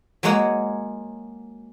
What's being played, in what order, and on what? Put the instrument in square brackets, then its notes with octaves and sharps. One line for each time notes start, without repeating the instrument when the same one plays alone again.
[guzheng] F#3 G#3 A#3 C#5 F#5